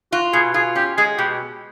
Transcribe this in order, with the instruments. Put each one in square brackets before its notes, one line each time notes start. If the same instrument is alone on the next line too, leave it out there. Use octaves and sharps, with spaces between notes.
[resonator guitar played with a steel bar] F4 [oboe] F#4
[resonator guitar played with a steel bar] B2 [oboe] G#4
[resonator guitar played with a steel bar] F4 [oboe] G#4
[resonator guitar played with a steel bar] C#4 [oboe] G4
[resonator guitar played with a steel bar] G#3 [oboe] G#4
[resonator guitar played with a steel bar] B2 [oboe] G4